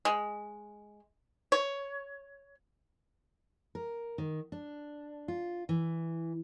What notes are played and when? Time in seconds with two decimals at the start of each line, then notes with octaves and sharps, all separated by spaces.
0.05 G#3
1.52 C#5
3.75 A#4
4.18 D#3
4.52 D4
5.28 F4
5.69 E3